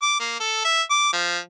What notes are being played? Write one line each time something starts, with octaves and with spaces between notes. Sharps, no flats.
D6
A#3
A4
E5
D6
F3